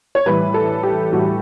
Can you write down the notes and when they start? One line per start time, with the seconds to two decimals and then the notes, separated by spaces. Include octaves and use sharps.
0.15 C#5
0.26 A2 E3 G3 B4
0.54 A4
0.83 G4
1.12 A2 E3 G3 F#4